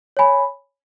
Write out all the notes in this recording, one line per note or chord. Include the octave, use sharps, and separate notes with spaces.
C#5 G#5 B5